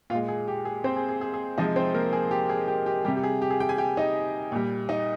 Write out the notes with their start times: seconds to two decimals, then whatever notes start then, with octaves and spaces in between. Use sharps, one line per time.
0.10 A#2 F4 F5
0.15 G#3
0.28 G#4
0.48 G4
0.65 G#4
0.84 C4 C5
0.97 G#4
1.09 G#4
1.21 G#4
1.34 G#4
1.58 C3 F3 G#3 D#4 D#5
1.76 C4 C5
1.95 A#3 A#4
2.13 G#4
2.31 G4
2.49 G#4
2.68 G4
2.86 G4
3.05 G3 G4
3.08 C3
3.16 G4
3.23 G#4
3.42 G4
3.50 G#4
3.60 G4 G5
3.69 G#4 G#5
3.78 G4 G5
3.97 D#4 D#5
4.52 A#2 G3
4.89 D#4 D#5